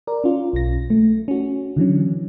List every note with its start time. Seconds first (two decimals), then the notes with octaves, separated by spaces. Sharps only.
0.07 A#4 D5
0.24 C#4 F4
0.53 B1 A#6
0.90 A3
1.28 C#4 F#4
1.77 D3 E3 F#3 C#4